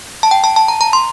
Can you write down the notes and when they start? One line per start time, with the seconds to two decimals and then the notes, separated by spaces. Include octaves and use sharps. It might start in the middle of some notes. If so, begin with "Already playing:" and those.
0.23 A5
0.31 G5
0.44 A5
0.56 A5
0.68 A#5
0.81 A#5
0.93 C6